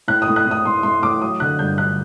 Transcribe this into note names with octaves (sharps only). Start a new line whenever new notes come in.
A2 F#6
D#6
A2
F#6
A2
D#6
A2 C6
A3 C6
A2 D6
F#3 D#6
D3 F#6
G2 G6
D3 F#6